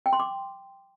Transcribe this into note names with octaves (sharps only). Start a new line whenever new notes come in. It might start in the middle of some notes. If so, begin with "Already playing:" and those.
G5
C6
D6